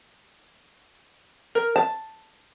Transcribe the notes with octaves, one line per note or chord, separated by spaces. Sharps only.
A#4
A5